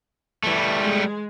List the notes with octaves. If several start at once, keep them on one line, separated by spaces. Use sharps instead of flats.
E3 G3 A3
G#3 G#4